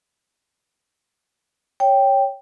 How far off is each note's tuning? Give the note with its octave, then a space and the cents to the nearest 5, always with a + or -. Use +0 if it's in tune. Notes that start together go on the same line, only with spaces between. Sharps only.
C#5 +0 G5 +0